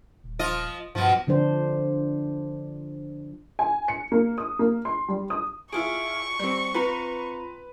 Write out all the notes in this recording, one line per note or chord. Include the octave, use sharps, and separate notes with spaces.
D#1
F3 F4 D#5
G2 B2 F3
D3 F3 D4 C5
G#5
C#7
A#3
D#6
A#3
C6
G3
D#6
E4 F4 G#4 C#6 D7
G3 C4
C4 F4 B4 A#5